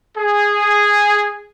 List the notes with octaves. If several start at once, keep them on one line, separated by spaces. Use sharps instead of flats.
G#4